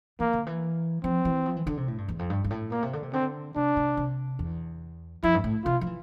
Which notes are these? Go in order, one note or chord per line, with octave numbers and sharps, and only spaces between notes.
E3 A#3
D3
E3
F3 C4
E3
F3
E3
D3
C3
A2
G2
E2
F2
G2
G2
A2
A#2 A#3
C3
D3
C3
D3 C4
C3 D4
C3
C3
E2
F2 E4
G2
A2
C3 F4
F3
E3